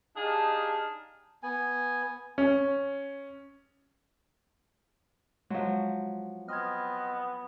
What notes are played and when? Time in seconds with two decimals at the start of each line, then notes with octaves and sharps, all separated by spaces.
0.16 D4 D#4 G4 G#4 F5 A5
1.43 B3 G#5
2.38 C#4
5.50 F3 F#3 G#3
6.48 B3 C4 D#5 F6 G#6